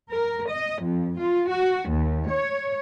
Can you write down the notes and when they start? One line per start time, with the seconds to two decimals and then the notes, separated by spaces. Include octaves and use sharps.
0.12 A#4
0.49 D#5
0.80 F2
1.18 F4
1.48 F#4
1.87 D#2
2.27 C#5